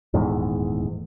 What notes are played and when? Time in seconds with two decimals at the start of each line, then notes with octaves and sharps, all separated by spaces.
0.14 D#1 E2 G#2 A3